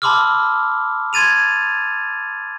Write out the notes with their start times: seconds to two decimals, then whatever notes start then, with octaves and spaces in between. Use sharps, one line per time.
0.02 A5 B5 C6 D6 E6 F6
1.13 C6 G#6 A6 D#7 F7